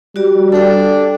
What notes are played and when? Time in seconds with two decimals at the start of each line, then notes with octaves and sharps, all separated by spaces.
0.16 G3 F#4 G4 D5
0.52 D4 A4 G5